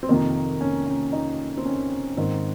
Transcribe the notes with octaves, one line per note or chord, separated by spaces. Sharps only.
C4
F2 C3 D#3 A#3
C#4
C#4
D#4
C4
C#4
G#2 D#3 C4